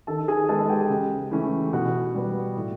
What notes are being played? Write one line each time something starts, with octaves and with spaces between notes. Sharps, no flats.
D#3 A4 A5
G#4 G#5
G#3 B3 A4 A5
G4 G5
C#3
E3 A3 C#4
B2 F#4 F#5
G3 B3
A2